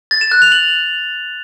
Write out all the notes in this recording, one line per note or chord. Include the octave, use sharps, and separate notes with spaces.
A6
E7
F#6
F7
F#7